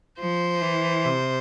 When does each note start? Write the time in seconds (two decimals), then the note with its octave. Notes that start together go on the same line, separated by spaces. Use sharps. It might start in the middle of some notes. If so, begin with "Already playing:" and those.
0.19 F3 C5
0.62 E3
1.05 C3